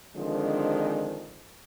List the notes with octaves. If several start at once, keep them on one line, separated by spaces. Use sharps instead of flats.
D3 D#3 F3 G#3 C4 D4